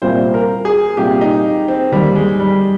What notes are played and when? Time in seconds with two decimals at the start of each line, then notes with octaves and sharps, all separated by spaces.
0.02 C2 A#2 G3 C5
0.34 A#4
0.65 G#4
0.97 C2 A#2 G3 G4
1.21 D#4
1.68 C4
1.92 D#2 D#3 G3 A#3 D#4
2.15 G#3
2.39 G3